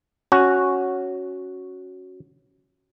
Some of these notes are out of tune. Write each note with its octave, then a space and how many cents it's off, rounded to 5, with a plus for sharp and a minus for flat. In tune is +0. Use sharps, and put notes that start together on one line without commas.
C#4 +0 F#4 +0